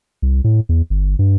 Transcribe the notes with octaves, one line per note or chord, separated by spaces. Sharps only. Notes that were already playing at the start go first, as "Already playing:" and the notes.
C2
A2
E2
G1
G2